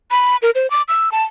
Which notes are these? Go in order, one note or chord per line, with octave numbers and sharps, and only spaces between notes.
B5
A#4
C5
D6
E6
A5